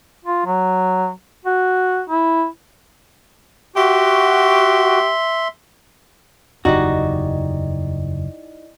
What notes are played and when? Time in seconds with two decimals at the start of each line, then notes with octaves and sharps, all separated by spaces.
0.25 F4
0.46 F#3
1.45 F#4
2.10 E4
3.76 F#4 G4 E5 C6
6.65 F#1 E2 D#4 E4 F#4 G4 D5 D#5